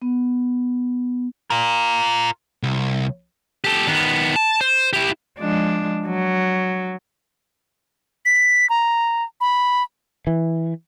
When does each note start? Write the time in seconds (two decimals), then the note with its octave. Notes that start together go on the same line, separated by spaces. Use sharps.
0.02 B3
1.50 F4 A#4
2.63 C2
3.64 G4 A4
3.87 D#3 B3
4.36 A5
4.61 C5
4.93 E4 G4
5.39 F3 G#3 D4
6.06 F#3
8.25 B6
8.70 A#5
9.41 B5
10.27 E3